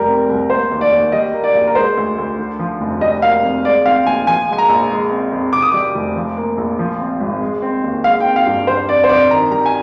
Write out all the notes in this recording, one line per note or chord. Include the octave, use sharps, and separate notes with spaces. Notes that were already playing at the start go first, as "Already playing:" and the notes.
Already playing: F1 G3 A#4
C4
C2
A#3 C5
D#2
D5
D#2
G3 D#5
A#3
D5
A#1
A#4
G#3 C5
D2
D2
D3
F3
F1
G3 D#5
A#3 F5
F2
G#3 D5
C4 F5
A#1 G#5
F3 G#5
G#3 G#5
A#5
A#1
G#3
C4
F2
C3 D6
D#6
G3 D6
F1
F3
A#3
A#1
F3
C4
G#1
G#3
C4
D#2
G#3 F5
G5
C4
F5
G2
G3 C5
F2 D5
C5
F2 D5
D#3 A#5
G3 A#5
G#5